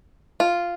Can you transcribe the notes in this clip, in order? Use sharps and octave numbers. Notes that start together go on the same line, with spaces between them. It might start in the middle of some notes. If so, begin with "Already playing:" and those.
F4